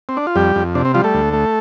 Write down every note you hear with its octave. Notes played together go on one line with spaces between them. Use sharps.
C4
D4
F4
F2 G3 G4
F2
C3 D4
C4
F3 G3 F4
A3 A4
D2
A3